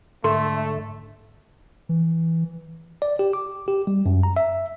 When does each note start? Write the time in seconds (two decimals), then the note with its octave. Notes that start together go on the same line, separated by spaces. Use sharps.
0.24 G#2 D3 A3 A4 E5 C6
1.89 E3
3.02 D5
3.19 G4
3.33 D6
3.68 G4
3.87 G3
4.06 F#2
4.23 A#5
4.36 E5